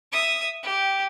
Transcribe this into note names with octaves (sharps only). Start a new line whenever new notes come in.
E5 D#6
G4